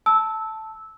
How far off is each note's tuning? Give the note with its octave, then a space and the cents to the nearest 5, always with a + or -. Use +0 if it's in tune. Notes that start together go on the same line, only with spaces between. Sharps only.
A5 +0 E6 -15